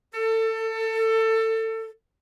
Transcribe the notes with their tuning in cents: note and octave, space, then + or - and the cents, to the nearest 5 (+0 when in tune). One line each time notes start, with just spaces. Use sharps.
A4 +25